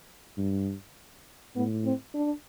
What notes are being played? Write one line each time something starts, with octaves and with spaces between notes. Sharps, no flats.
G2
A2 B3
C4
D4